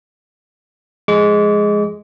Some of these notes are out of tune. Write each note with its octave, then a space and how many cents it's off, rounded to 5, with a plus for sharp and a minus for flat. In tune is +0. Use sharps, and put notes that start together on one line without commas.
F3 +0 G#3 +0 D6 -40